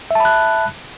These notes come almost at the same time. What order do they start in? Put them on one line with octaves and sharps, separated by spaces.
E5 A5 B5 F#6